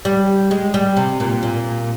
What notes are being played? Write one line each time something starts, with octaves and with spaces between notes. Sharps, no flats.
G3
G#3
G3
C3
A#2
A#2